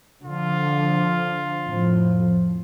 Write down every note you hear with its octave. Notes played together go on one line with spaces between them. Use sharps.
D3 F3 F4
F2 A2 F3